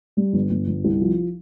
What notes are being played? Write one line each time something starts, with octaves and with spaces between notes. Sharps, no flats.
G3
G1
G1
G1
C2
F3